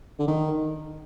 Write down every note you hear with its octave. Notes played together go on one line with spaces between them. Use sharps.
D3
D#3